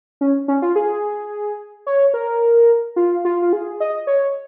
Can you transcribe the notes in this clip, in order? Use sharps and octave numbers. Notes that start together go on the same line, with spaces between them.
C#4
C#4
F4
G#4
C#5
A#4
F4
F4
F4
G#4
D#5
C#5